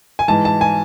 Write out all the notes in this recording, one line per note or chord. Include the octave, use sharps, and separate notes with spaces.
G#5
G#2 E3 A5
A5
G#5